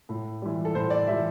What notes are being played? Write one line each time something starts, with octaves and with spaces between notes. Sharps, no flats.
A2
E3 G3
A4
A2 C5
D5
E3 G3 E5